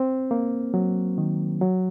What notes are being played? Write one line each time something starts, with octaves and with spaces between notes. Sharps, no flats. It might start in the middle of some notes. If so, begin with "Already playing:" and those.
Already playing: C4
A#3
F#3
D#3
F#3